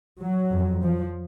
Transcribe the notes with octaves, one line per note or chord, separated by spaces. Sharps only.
F#3
F2
F3